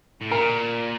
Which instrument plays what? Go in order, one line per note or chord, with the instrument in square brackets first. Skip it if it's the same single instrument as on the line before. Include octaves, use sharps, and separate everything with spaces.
[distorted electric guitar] A2
[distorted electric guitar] A#2 [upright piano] A#4